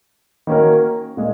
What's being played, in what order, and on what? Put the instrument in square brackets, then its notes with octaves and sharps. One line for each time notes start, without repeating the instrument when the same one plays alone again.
[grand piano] D#3 A#3 C#4 F#4 A#4
A#2 G#3